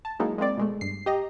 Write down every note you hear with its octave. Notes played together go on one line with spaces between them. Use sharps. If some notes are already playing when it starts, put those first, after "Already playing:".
A5
F#3 G#3 A#3 D#4 E4
G#3 A#3 C4 D5
B2 G#3 A3
G2 C7
G4 D#5 A#5